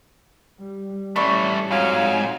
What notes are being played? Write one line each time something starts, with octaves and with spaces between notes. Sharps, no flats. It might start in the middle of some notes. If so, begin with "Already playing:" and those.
G3
E3 G3 A3 C#4 D5 B5 C#6
F2 G#2 F#3 G#3 F5